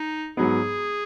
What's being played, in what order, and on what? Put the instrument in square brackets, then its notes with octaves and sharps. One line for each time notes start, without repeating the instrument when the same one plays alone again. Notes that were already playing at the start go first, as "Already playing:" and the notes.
Already playing: [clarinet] D#4
[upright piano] G#2 F#3 B3 [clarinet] G#4